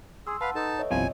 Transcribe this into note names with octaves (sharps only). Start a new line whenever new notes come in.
G#4 C6 E6
B4 F5 F#5 A5
D#4 A4 B4 A5
C#5 D#5 E5
G1 C2 F3 G#5